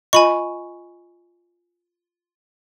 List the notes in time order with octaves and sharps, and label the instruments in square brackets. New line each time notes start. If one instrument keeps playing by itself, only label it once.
[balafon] F4 D#5 [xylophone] G#5 B5 C#6